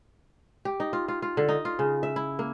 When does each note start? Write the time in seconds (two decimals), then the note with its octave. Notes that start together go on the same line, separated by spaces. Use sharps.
0.65 G4
0.80 D#4
0.93 F4
1.08 F4
1.22 F4
1.37 D3
1.49 D#4
1.65 F4
1.79 C#3
2.03 E5
2.16 E4
2.39 A#3